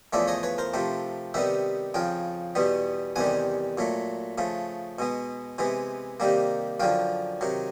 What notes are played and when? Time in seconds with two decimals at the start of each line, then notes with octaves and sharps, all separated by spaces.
0.13 E2 C#3 F3 A3 D5 E5
0.28 C#5 D#5
0.43 B4 C#5
0.58 A#4 C5
0.74 C3 F3 A3 C4
1.34 C3 D#3 G3 B3 E5 F#5
1.94 F2 C#3 F3 F5 G5
2.55 E2 B2 G3 B3
3.16 E2 C3 D#3 G3 F#5 G#5
3.78 A#2 F#3 A3
4.38 C#3 F3 A3
4.99 B2 G#3 B3
5.58 C3 E3 G#3 B3
6.20 C3 D#3 G3 A#3
6.80 F#2 D3 F3 F5 G5
7.41 C3 D#3 F#3